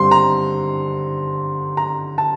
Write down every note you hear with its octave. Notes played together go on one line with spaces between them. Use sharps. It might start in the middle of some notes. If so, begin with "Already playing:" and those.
Already playing: G2 D3 G3 C4 C6
A#5
A#5
A5